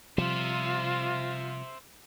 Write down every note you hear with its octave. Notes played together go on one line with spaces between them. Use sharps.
C3 F3 G3 F4 C5 E5